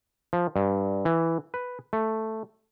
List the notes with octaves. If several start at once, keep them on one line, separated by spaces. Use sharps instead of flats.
F3
G2
E3
B4
A3